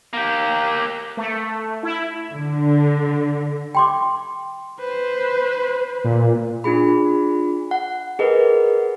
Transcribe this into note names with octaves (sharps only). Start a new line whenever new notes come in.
A#3 G4
A3
E4
D3
G5 C6 D6
B4 C5
A#2
D4 F4 G#4 B5
F#5
G#4 A#4 B4 D#5 F#5